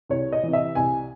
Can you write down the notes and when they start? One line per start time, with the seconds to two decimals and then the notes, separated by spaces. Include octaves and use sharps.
0.09 C2 C#5
0.32 D#5
0.43 C3 E3
0.53 E5
0.75 C2 G#5